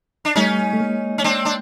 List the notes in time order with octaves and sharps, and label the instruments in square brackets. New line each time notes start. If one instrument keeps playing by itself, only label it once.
[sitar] D4
[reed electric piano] G3 A3 [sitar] C#4 D#4
[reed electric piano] A3
G#3 A#3
[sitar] C#4
C4 D4
D4